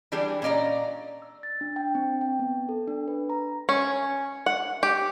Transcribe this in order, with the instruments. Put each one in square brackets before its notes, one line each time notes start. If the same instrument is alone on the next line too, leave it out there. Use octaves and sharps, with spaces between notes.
[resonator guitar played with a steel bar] E3 G3 D4 G4 G#4
A#2 C#4 D5 D#5 A#5
[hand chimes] E6
A6
D4
G5
C4
G5
B3
A4
D4
B4
A#5
[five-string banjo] C#4
F#5
G4